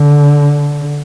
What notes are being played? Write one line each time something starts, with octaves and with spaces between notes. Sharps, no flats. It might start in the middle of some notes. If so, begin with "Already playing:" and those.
Already playing: D3